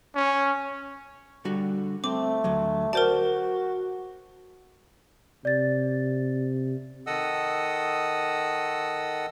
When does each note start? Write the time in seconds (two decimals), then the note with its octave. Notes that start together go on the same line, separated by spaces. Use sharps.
0.15 C#4
1.45 D3 G3 F#4
2.04 A3 C4 D6
2.44 D2 F#3
2.93 F#4 A#4 C5 D5 A5
5.45 C3 D5 A6
7.07 D#3 A4 D#5 F#5 D#6 E6